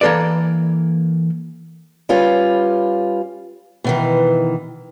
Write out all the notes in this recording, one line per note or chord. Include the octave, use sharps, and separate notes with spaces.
E3 A#3 A4 B4 D5
G3 C#4 F4 B4
B2 D#3 E3